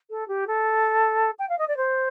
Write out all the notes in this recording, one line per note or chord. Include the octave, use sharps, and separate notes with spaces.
A4
G4
A4
G5
F5
D#5
D5
C5